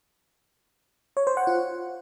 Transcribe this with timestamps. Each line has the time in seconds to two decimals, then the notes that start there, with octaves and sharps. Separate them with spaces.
1.17 C#5
1.27 C5
1.37 F#5
1.47 F4